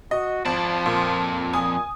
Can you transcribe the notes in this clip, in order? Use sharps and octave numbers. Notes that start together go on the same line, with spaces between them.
F#4 D#5
G#1 F2 F3 A5
A#2
A#2 G#5 D#6